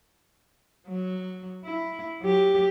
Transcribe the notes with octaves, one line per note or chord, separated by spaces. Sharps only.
F#3
E4
F#3 G4